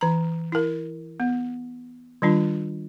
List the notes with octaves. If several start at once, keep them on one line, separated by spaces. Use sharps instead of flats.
E3 A#5
E4 A#4
B3
D#3 G3 D4 F4